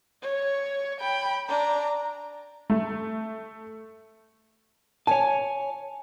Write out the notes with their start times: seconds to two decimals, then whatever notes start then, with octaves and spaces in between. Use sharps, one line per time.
0.22 C#5
1.01 G5 B5
1.49 D4 A#5
2.70 A3
5.07 C#5 G#5 A5